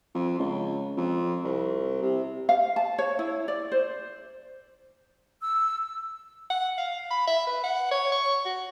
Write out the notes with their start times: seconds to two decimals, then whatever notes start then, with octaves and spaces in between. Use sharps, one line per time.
0.15 F2
0.39 C#2
0.97 F2
1.44 C2
2.03 C3
2.49 F5
2.76 A5
2.99 C#5
3.19 E4
3.48 D5
3.72 C5
5.43 E6
6.50 F#5
6.78 F5
7.10 B5
7.27 E5
7.47 B4
7.64 F#5
7.91 C#5
8.12 C#6
8.45 F#4